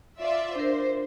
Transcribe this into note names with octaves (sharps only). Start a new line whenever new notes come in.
F4 D5 E5
D4 A#4 C5